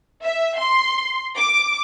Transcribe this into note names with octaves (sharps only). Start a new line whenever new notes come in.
E5
C6
D6